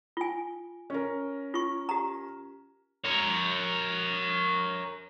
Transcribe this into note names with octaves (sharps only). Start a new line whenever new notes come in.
F4 G#5
C#4 A#4
F4 C#6
G4 A#5
A#4 C#5